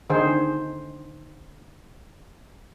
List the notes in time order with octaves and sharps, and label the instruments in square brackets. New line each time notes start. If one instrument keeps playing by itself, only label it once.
[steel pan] D3 D#3 D#4 G#4 C5